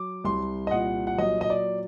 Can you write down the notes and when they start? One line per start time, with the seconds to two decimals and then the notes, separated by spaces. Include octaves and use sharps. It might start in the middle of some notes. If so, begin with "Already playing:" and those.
Already playing: F#3 D6
0.24 C2 C6
0.67 D#5
0.71 A#2 F#5
1.07 F#5
1.18 F#3 D#5
1.41 D#5
1.50 D5